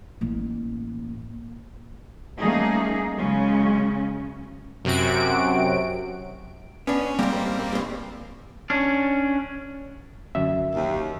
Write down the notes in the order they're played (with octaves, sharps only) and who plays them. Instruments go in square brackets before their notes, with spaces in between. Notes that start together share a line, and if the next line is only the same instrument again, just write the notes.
[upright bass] A1 A#3
[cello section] G3 A3 A#3 C#4 D#4 G#4
C#3 F#3 G#3 C#4
[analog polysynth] F#2 C3 F#4 D7
[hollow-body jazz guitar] B3 D4 [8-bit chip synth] C#4
[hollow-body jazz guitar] C2 G#2 [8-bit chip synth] G3 A#3 C4
[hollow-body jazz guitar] C#2 G2
[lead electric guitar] C#4 D4
[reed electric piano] F#2 E5 [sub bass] D3
[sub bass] G#1
[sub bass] D#1 [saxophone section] D#2
[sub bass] F1